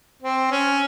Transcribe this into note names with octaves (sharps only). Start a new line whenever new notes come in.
C4
C#4